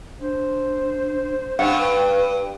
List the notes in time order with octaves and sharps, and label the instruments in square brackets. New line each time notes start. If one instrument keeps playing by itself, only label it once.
[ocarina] D4 [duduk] C5
[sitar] G2 [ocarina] D#4 [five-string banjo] F#5
[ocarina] B4